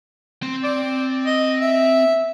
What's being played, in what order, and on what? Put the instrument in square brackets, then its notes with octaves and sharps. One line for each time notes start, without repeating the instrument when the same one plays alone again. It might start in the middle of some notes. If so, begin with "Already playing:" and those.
[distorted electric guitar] C4 C6
[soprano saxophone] D5
D#5
E5